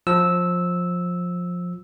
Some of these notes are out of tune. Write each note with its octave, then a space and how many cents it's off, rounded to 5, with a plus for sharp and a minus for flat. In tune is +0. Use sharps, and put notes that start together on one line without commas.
F3 +20 E6 -10